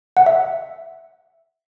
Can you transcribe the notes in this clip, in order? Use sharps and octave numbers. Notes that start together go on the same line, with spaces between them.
F#5
E5